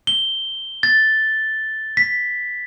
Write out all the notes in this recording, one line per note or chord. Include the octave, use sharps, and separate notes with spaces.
G7
A6
B6